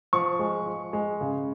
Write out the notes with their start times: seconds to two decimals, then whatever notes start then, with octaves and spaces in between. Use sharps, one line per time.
0.13 F3 C#6
0.39 G#3
0.66 F3
0.93 G#3
1.21 C#3